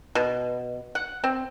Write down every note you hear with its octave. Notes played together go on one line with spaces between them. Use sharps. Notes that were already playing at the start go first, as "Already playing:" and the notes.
B2
F#5
C4